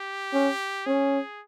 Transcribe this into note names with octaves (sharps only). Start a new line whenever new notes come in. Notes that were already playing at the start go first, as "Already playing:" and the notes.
Already playing: G4
C#4
C#4 G#4